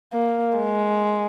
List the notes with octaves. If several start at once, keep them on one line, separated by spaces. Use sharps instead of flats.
A#3
G#3